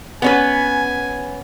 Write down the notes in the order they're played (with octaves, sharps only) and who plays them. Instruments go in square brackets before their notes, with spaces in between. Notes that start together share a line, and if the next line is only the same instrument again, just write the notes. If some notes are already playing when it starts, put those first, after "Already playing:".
[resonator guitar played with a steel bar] B3 C#4 B4 [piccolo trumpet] G#5